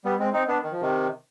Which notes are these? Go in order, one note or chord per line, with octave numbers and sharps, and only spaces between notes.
G3 B3
G#3 C4
C4 D#4
B3 D4
D#3
F3
C3 D#3